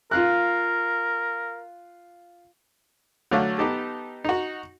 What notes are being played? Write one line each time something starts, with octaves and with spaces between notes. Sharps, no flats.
F4 A#4 F5 F#6
D3 F#3 A3 F5
B3 D#4 G4 A4
D#4 F#4